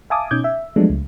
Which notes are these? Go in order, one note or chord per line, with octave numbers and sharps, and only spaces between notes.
E5 F5 G#5 A5 D6 D#6
B2 C#4 D#4 D6 G6 G#6
E5
F3 F#3 G#3 A3 B3 D4
C#2